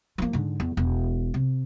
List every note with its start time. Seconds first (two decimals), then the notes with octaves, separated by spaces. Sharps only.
0.18 F3 A#3
0.33 G#2 D3
0.60 E2
0.77 E1
1.34 C3